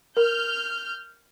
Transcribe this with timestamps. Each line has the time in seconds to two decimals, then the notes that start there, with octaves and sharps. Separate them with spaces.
0.17 A#4 F6 G6